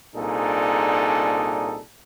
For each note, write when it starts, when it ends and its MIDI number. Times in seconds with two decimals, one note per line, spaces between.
0.16 1.81 36
0.16 1.81 46
0.16 1.81 62
0.16 1.81 63
0.16 1.81 68
0.16 1.81 69